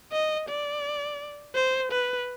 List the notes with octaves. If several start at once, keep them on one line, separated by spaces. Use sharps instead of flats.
D#5
D5
C5
B4